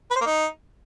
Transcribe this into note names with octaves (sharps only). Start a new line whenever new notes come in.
B4
C5
A#3
D#4